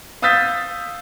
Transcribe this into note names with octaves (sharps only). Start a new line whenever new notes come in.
F5 D#6 E6 G6 A6 B6